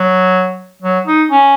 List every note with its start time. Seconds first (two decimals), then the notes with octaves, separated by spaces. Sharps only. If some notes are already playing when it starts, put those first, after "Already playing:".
Already playing: F#3
0.82 F#3
1.07 D#4
1.31 C#4